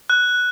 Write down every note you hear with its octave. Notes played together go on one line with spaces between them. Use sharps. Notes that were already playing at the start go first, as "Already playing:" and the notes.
F#6